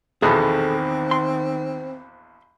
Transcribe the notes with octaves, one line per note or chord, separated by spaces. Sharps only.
A#1 E2 B2 D#3 C4 G#4 A4
C6